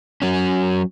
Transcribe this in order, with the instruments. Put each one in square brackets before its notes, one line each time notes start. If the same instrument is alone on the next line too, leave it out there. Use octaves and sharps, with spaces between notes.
[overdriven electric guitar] F#3 C#4